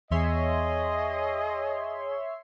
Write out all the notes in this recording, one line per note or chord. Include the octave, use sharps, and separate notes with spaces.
E2 G#4 C#5 D#5 E5 C6